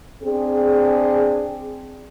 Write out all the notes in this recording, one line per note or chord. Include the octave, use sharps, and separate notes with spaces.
C4 D4 G#4